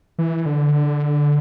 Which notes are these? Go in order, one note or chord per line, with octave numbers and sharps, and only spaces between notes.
E3
D3